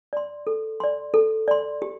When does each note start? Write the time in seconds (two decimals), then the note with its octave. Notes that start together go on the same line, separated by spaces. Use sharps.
0.13 D5 C6
0.47 A4
0.80 D5 C6
1.14 A4
1.48 D5 C6
1.82 G4